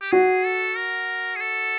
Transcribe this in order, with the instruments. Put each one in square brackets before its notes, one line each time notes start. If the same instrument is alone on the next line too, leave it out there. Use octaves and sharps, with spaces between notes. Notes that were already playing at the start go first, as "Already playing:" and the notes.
[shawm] G4
[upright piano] F#4 [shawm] G#4
[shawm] A4
A#4
G#4
A4